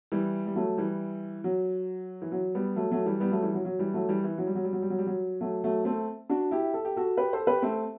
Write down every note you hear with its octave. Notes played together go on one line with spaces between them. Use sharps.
E3 G3
G3
F#3 A3
E3 G3
F#3
E3
F#3
G3 B3
F#3 A3
F#3 A3
E3 G3
G3 B3
F#3 A3
E3 G3
F#3
F#3
E3 G3
F#3 A3
E3 G3
E3
F#3
G3
F#3
G3
F#3
G3
F#3
G3
F#3
F#3 A3
F#3 A3
A3 C4
D4 F#4
E4 G4
A4
G4
F#4 A4
G4 B4
A4 C5
G4 B4
A3 C4